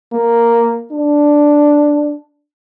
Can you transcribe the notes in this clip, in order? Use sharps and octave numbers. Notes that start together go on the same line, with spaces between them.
A#3
D4